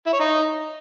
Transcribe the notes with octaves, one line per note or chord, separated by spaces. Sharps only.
E4
C#5
D#4